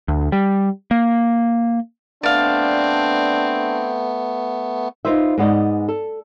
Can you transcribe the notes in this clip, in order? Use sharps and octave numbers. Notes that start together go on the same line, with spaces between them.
D2
G3
A#3
A3 B3 C4 D4 D5 F5
D#4 F4 B4 C5 E5
G#2 B3 D5 D#5
A4